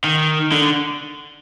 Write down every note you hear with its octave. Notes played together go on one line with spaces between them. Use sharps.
D#3
D3